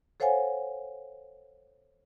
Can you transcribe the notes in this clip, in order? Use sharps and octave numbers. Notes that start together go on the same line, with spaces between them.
A4 C5 C#5 F5 F#5 G#5